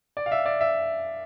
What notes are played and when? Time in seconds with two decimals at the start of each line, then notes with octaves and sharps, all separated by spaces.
0.17 D5
0.26 F5
0.32 E5
0.46 D5
0.61 E5